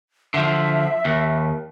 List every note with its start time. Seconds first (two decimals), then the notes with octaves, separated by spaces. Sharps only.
0.34 D3 F3 E5
1.05 D#2